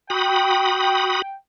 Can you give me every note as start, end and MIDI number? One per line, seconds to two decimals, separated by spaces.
0.10 1.22 66
0.10 1.35 79
0.10 1.22 83
0.10 1.22 87